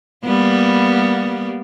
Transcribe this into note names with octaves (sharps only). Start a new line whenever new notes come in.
G3 A#3 B3